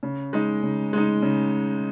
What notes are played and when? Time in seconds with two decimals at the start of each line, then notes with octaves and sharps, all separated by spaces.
0.03 C#3
0.33 G#3 D#4
0.63 C#3
0.93 G#3 D#4
1.22 C#3